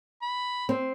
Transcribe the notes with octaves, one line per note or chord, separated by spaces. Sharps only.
B5
C4